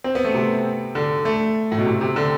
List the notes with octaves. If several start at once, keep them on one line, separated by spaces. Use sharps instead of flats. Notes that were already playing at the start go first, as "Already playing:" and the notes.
C4
B3
A3
C3
D3
A3
A2
B2
C3
C3
D3